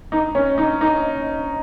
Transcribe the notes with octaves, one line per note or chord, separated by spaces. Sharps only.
D#4
C#4
D#4
D#4